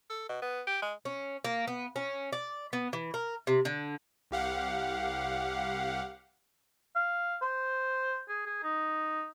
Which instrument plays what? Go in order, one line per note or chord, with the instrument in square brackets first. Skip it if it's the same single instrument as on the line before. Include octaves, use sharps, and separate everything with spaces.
[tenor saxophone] A4
B2
B3
G4
G#3
[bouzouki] C#4
A#3
B3
C#4
D5
B3
E3
A#4
C3
D3
[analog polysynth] C2 G4 F5 F#5
[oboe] F5
C5
G#4
G#4
D#4